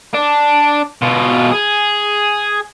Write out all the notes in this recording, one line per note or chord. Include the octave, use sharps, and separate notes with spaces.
D4
B2 F4
G#4